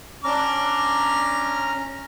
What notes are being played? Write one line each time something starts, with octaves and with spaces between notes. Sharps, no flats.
C#4 D4 A#5 D6 F6